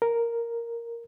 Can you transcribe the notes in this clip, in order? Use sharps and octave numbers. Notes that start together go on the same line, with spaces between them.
A#4